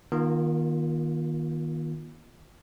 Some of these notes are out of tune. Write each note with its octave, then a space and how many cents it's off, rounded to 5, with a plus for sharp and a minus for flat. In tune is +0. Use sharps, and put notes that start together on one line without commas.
D#3 +0 A#3 +45 F4 +5